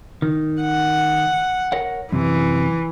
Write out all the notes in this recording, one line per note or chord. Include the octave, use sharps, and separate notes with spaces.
D#3
F#5
A#4 C#5 F#5
F#2 C3 E3